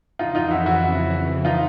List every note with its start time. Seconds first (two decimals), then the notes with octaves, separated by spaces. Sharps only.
0.19 F2 C#3 E3 D#4 F4
0.35 D#4 F4
0.51 E4 F#4
0.66 E4 F#4
1.45 D#4 F4